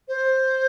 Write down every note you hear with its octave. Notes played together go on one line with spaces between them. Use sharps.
C5